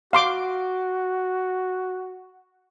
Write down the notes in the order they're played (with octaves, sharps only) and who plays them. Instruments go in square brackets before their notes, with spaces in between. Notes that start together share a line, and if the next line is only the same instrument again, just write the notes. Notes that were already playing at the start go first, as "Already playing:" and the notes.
[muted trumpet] F#4 [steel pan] F5 C6 D6